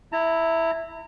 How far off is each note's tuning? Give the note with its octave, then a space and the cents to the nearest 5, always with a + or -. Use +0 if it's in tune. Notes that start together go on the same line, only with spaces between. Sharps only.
E4 +0 A#5 -35